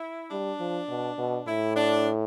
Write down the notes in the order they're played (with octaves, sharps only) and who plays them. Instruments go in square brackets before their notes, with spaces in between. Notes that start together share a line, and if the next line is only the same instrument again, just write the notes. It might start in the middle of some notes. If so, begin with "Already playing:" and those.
Already playing: [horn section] E4
[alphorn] G3 [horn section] D4
[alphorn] F3
B2
B2
[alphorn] A2 [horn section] E4
[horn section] D4